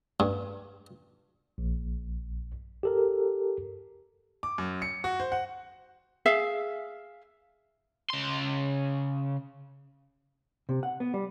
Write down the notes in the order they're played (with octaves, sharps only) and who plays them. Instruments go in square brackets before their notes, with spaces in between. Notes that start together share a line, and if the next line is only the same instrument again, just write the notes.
[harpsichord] G2
[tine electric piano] A#1
G4 A4 A#4
[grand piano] D6
F#2
C#7
F#4
C5
F#5
[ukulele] G#4 E5 F5
[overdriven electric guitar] C#3 C6
[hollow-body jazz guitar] C3
F#5
B3
G3